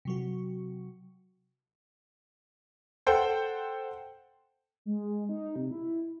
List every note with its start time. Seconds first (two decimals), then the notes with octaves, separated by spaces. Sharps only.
0.05 C3 F#3 F#4
3.07 A4 C5 F#5 G5
4.86 G#3
5.29 D#4
5.56 C3
5.71 E4